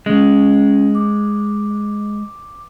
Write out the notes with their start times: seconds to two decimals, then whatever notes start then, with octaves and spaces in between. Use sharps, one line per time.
0.06 G#3 C#4
0.95 D6